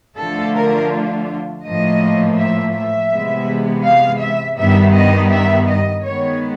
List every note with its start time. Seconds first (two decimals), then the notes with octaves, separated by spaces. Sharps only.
0.17 D3 F3 A3 D4 F4 A4
0.55 A#4
1.65 A2 F3 A#3 D#5
2.38 E5
2.74 E5
3.11 C3 E3 G#3 B3
3.85 F5
4.21 E5
4.58 G2 D#3 G3 B3 E5
4.94 D#5
5.31 E5
5.68 D#5
6.04 D#3 G#3 B3 C#5